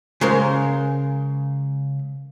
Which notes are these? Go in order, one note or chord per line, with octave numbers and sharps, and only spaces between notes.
C#3 G#3 A#4 C5